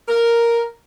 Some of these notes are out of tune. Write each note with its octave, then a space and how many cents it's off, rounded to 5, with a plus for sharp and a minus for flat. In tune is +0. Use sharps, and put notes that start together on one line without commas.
A#4 +0